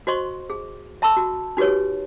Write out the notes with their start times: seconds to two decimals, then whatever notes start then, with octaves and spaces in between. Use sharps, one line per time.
0.07 F#4 C5 D#5 C6 C#6
0.50 G#4
1.02 E5 A5 B5 C#6 E6
1.17 F#4
1.57 D#4 F#4 G4 B4 C#5